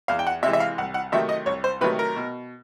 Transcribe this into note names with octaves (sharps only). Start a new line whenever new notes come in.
E2 F5
G5
F#5
C3 E3 G#3 E5
E5
F5
C2 F#5
F#5
C3 D#3 F#3 A3 E5
D#5
C2 C#5
C5
C3 D#3 F#3 A3 B4
A#4
B2